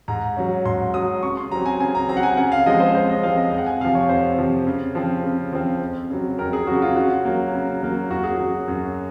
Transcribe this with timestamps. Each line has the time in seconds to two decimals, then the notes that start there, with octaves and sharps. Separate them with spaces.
0.08 G#2 A#5
0.37 F#3 C#4
0.65 G#2 C6
0.94 F#3 C#4 D#6
1.23 C#3 C#6
1.37 C6
1.51 F#3 A#5
1.55 C4
1.66 G#5
1.80 C#3 G#5
1.95 A#5
2.09 F#3 C4 A#5
2.17 F#5
2.23 G#5
2.37 C#3 F#5
2.52 F5
2.66 F3 G#3 C4 D#5
2.80 C5
2.95 C#3 C5
3.10 D#5
3.23 F3 G#3 C4 F5
3.38 D#5
3.50 F2 F5
3.58 F#5
3.66 G#5
3.80 C3 F5
3.85 F3
3.95 C#5
4.09 F2 C5
4.38 C3 F3
4.67 C#3
4.95 F3 C4
5.24 C#3
5.53 F3 C4
5.82 F2
6.10 C#3 F#3
6.39 F2 A#4
6.53 G#4
6.67 C#3 F#3 F#4
6.82 F4
6.96 C#3 F#4
7.25 F#3 A#3
7.53 C#3
7.82 F#3 A#3
8.10 F#2 F#4
8.23 G#4
8.36 C#3 F#3 F#4
8.68 F#2